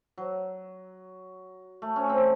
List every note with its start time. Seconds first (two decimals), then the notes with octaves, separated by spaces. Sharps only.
0.18 F#3
1.82 A3
1.96 C#4
2.09 C4